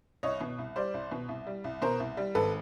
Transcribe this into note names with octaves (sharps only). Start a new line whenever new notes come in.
C2 C#5 D#5
B2
C2
G3 C5 D5
C2
B2
C2
G3
C2
B2 A#4 C5
C2
G3
G#1 A4 B4